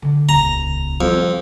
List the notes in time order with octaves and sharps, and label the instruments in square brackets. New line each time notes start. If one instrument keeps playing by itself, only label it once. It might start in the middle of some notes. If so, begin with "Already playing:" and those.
[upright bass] D3 E3
[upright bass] D#1 C#2 [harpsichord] A#5
[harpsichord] F2 [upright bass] G3